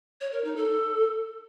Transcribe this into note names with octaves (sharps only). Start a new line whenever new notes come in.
C#5
A#4
D#4
A4